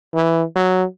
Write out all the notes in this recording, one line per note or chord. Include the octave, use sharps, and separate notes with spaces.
E3
F#3